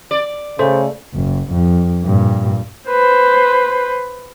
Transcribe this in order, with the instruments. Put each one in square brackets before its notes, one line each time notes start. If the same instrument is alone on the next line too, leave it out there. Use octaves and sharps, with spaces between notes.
[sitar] D5
[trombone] C#3 [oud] A3 [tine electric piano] C5
[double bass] F#1
F2
G2 A#2
[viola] B4 C5